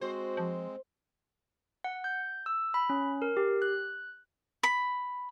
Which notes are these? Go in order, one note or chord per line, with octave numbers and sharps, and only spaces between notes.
G#3 C4 F#4 C5
F3
F#5
G6
E6
B5
C#4
A#4
G4
F#6
B5